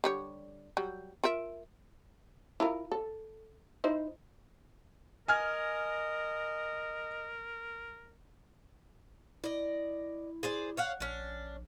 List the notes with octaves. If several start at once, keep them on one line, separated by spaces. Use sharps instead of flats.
D3 G3 C#5
F#3 G3
F4 A#4 E5
E4 F4 A#4
A4
D#4 E4 C5
A#4 D#5 G#5 F6 G#6
E4 D5 D#5
G#4 C5 D5
C#5 F5 F#5
A#1 C#4 D4